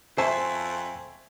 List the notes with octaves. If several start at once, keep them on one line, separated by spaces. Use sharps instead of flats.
F2 C5 E5 G#5 A5 C6 C#6